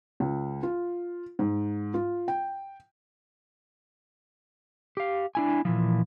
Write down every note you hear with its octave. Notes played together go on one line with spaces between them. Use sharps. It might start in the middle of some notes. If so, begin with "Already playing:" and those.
C#2
F4
G#2
F4
G5
G4 F5
D4 E4 G#5
A#2 E3 F3